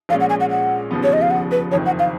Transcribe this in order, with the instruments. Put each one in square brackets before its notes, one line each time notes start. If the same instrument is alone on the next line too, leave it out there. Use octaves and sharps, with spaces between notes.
[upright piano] A#1 A#2 G#3 C#4 [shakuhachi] F5
[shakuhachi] F#5
G#5
F#5
F#5
[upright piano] F1 D#2 C#3 F3 B3
[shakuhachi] C#5
D#5
F5
F#5
B4
[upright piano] F#1 F2 D#3 [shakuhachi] C#5
[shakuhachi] F#5
F5